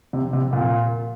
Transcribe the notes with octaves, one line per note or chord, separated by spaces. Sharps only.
C3
C3
A#2